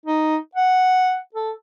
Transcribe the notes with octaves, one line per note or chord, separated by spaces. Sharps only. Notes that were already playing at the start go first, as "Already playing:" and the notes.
D#4
F#5
A4